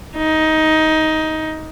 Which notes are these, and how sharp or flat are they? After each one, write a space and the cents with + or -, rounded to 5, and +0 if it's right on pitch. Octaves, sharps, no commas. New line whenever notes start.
D#4 +15